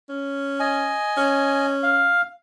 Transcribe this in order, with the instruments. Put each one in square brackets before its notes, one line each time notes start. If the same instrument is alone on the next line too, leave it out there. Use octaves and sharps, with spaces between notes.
[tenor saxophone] C#4
[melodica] D#5 G#5
[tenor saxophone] C#4
[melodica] F5